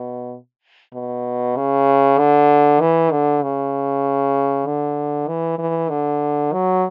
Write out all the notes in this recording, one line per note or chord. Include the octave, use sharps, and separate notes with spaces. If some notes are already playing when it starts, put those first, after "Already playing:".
Already playing: B2
B2
C#3
D3
E3
D3
C#3
D3
E3
E3
D3
F#3